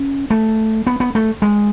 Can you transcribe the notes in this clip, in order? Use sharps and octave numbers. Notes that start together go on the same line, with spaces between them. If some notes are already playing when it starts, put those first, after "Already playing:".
Already playing: C#4
A3
B3
B3
A3
G#3